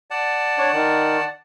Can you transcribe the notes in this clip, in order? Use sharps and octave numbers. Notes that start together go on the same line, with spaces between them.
D5 F#5 A5
D4 C#5
D#3